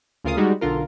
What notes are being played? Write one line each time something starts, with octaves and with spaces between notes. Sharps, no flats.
D2 C#3 F4 A#4 F5 D#6
G3 G#3 D#4 F#4
B1 D3 F4 A#4